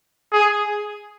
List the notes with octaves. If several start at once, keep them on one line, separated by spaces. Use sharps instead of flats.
G#4